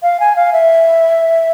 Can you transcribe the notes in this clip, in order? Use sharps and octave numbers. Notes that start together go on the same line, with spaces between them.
F5
G#5
F5
E5